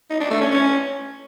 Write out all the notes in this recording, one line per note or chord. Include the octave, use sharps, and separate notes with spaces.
D#4
D4
A3
C#4
C#4